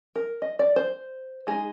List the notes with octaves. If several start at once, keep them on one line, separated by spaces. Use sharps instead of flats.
A#4
D#5
D5
C5
G#3 D#4 G#4